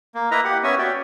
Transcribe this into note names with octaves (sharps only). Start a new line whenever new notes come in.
A#3
A#3 E4 B4 D#5 E5 A#5
G4 F#5
B3 C#4 C#5 E5 G#5
F#4 D5 E5 G5